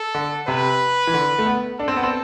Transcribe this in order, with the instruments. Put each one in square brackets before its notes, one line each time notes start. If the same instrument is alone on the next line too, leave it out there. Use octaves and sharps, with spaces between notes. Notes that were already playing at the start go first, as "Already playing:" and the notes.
Already playing: [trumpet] A4
[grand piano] D3
[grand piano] C3 [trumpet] B4
[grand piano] E3
D3
A3
B3
[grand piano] D4 [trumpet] A4
[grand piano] C4
B3
C4